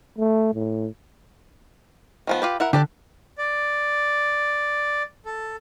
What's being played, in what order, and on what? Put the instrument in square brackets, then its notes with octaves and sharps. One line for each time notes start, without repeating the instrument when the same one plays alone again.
[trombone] A3
A2
[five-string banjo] D#3 F3 B3
F4 G4 B4
E4 A#4 F#5
[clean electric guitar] D3 [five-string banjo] G4 A4 D5
[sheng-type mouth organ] D5
A4